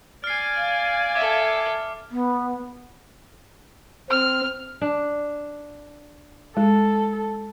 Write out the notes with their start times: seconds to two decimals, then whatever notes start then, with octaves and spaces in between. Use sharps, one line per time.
0.24 D5 G#5 F6 C7
0.57 F5
1.15 A4 E5 D6
2.11 B3
4.10 C4 F6
4.81 D4
6.57 G#3 A4